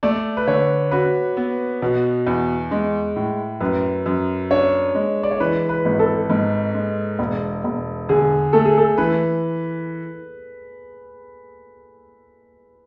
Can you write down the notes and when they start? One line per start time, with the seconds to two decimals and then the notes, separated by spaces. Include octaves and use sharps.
0.03 A3 D5
0.37 B4
0.47 D3 C#5
0.91 F#4 B4
1.37 B3
1.82 B2
2.27 E2
2.71 G#3
3.16 A2
3.60 F#2 B4
4.06 F#2
4.51 D4 C#5
4.95 G#3
5.23 D5
5.31 C#5
5.40 E3 B4
5.69 B4
5.85 G#1
5.99 A4
6.30 G#2
6.74 G#3
7.19 E1
7.64 E1
8.09 D3 G#4
8.53 A3 A4
8.65 G#4
8.78 A4
8.98 E3 B4